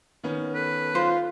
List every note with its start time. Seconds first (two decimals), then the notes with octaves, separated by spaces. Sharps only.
0.23 D#3 B3 C#4
0.54 A4 B4
0.95 F4 C5